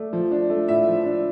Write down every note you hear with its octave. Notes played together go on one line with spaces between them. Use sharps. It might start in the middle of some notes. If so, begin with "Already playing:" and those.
Already playing: A3 D5
F3
D4
A3
A2 E5
F3
D4